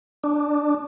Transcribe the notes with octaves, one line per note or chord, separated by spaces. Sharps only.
D4